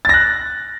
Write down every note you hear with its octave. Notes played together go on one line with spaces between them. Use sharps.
F#6 A6 A#6